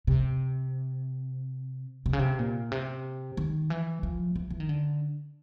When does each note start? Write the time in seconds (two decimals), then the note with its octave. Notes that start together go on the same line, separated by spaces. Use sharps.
0.07 C3
2.06 C3
2.13 C#3
2.19 C3
2.39 A#2
2.72 C3
3.37 D#3
3.70 E3
4.03 F3
4.36 E3
4.50 E3
4.60 D#3
4.69 D3